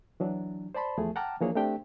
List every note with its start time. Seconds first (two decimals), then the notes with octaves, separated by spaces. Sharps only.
0.20 E3 F#3 D4
0.75 C5 D5 A5 B5 C6
0.98 E2 F3 A3 G#4
1.16 F#5 G5 A5 A#5 D6 F6
1.41 E3 F3 A#3 D4 G#4 C#5
1.56 A3 C4 D4 G4 G5